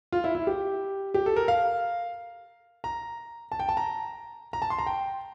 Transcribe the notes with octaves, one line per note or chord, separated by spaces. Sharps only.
F4
E4
E4
G4
G4
A4
A#4
F5
A#5
A5
G5
A5
A#5
A#5
A5
C6
A#5
G5